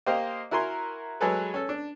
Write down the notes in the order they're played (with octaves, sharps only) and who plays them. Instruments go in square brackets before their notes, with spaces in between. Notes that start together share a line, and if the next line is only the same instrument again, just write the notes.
[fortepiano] A#3 G4 C5 D#5 F5
E4 F#4 A#4 G#5 C6
F#3 G#3 G#4 A4 B4
C#4 A4
D4